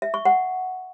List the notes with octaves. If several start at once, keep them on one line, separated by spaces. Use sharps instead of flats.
E5
C#6
F#5